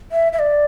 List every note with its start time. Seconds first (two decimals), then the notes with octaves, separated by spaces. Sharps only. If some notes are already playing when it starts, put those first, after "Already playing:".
0.12 E5
0.33 E5
0.39 D5